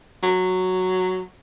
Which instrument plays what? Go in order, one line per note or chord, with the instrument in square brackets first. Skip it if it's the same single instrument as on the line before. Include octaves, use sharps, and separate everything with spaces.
[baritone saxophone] F#3